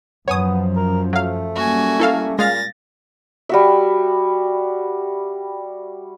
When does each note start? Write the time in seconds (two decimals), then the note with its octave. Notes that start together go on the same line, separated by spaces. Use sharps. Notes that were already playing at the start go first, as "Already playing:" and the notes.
0.28 F#2 F3 B3 C#5 G#5 D#6
0.76 A#4
1.13 F#3 A3 F5
1.56 G3 A#3 C#4 F#4 G#5
2.00 E4 A4 F5
2.39 A#2 G#3 F5 A6 A#6
3.49 G3 F#4 E5